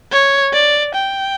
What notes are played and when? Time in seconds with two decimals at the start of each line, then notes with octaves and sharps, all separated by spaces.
0.12 C#5
0.53 D5
0.95 G5